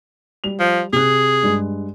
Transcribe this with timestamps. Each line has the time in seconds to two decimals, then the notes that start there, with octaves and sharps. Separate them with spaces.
0.44 G3 F7
0.60 F3
0.93 C3 G#4 F#6
1.43 G2 G#3